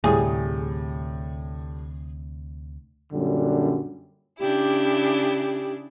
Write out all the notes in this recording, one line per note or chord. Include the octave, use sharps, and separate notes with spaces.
D2 A2 C3 G3 G#4
F#2 A#2 D3 G3
C#3 D4 E4 G4